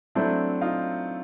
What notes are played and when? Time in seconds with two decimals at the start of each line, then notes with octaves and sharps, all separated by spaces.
0.15 F#3 A3 C4 D4 E4
0.61 D#4 F4